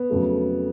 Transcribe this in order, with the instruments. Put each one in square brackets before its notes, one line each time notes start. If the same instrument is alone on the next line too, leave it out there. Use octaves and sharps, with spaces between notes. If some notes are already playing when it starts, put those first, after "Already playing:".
Already playing: [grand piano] B3
F2 C#3 F#3 A3